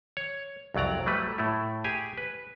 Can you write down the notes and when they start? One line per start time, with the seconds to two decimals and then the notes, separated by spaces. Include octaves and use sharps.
0.17 C#5
0.74 C2 F2 F#3 D5 A#5
1.06 F#3 G3 A3 B4
1.38 A2 A3 E4
1.84 G4 G#4 G#5
2.18 B4